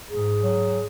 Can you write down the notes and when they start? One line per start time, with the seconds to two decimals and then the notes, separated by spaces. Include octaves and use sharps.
0.10 G#2 G#4
0.42 F#3